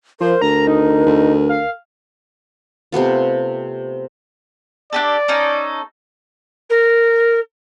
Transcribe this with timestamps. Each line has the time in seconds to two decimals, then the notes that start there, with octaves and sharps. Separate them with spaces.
0.20 F3 A#4 C5
0.42 D2 A#5
0.67 D#4
1.06 D2
1.49 F5
2.92 C3 A3 B3 F4
4.93 D4 G4 A4 D5
5.28 C#4 D#4 A4
6.69 A#4